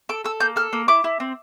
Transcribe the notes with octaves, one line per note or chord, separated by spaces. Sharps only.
A4 D6
A4 E6
A#3 G6
A4 F6
A#3
E4 D6
E4
C4